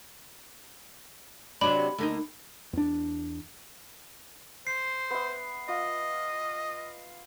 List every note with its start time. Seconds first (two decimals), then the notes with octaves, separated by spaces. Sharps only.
1.61 C3 F#3 D4 B5
1.98 D2 A#3 D#4
2.73 E2 D4
4.67 C5 C7
5.10 B3 E5
5.68 F4 D#5